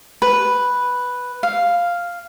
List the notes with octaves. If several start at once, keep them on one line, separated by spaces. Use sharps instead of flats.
B4
F5